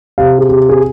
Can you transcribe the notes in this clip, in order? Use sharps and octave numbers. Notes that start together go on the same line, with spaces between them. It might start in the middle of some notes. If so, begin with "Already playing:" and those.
C3 F5
G#4
C3
G#4